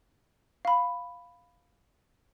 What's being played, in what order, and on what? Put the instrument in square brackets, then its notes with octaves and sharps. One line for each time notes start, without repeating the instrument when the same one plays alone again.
[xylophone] F5 B5